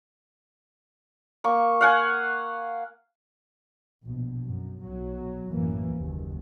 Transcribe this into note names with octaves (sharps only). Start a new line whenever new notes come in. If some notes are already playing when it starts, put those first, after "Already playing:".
A#3 C#6
F5 F#5 G#5
A#1 B2
F#2
B1 F#3
A1 F#2 E3 A#3
F#1 D#2